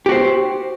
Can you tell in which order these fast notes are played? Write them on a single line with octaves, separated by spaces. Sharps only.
G4 F#4 C5